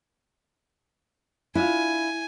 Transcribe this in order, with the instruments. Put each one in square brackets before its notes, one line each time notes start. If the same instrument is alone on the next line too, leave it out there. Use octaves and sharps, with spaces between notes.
[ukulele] D4 F4 [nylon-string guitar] E4 [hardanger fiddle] G#5